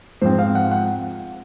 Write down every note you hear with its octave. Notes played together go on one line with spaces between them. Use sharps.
G#2 F3 C4 C5
F5
F#5
F#5